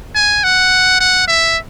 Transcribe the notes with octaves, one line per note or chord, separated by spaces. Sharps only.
G#5
F#5
F#5
E5